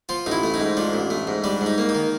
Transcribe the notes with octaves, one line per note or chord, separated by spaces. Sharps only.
F3 F4
A1 D#4
E4
A3
D#4
G#2
F3 D4
A1
A3
G#2
G3 D4
G#2
D#4
A#3
D#4
D#3